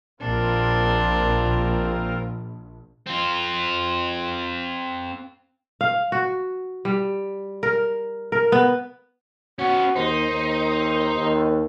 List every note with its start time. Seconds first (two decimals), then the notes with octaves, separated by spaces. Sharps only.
0.20 A#1 C4 D4 F4 A#4
3.07 C4 F4
5.81 F5
6.12 F#4
6.85 G3
7.63 A#4
8.32 A#4
8.52 B3
9.59 B3 C#4 F#4
9.96 D#2 D#4 C5
10.30 D#2
11.16 D#2